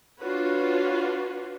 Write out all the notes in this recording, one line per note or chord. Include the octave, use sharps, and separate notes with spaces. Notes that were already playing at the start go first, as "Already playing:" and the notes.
D4 F4 F#4 B4 C#5